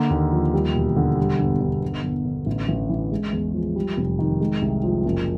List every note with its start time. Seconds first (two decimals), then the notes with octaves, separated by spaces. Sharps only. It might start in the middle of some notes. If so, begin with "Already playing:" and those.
Already playing: D3 A#3
0.10 D#2
0.32 F3
0.54 G3
0.75 E1
0.96 D3
1.18 G3
1.39 G1
1.61 D3
1.83 G1
2.03 G1
2.25 D3
2.46 A1
2.68 A1
2.89 E3
3.12 G#3
3.33 E2
3.54 F3
3.76 G3
3.97 F1
4.19 D#3
4.41 G#3
4.62 C2
4.84 F3
5.05 F#1